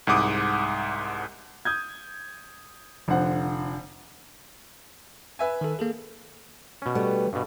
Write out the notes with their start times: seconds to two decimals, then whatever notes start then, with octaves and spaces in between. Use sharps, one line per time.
0.07 C2 G#2 F#5 D6 D#6
1.65 D#6 G6 G#6
3.08 F1 D3 F3 C5 F#5
5.39 B4 E5 G#5
5.61 D#3 A4
5.79 A#3 G#4 A4
6.82 B2 C#4
6.95 G3 A3 B3
7.33 G2 B2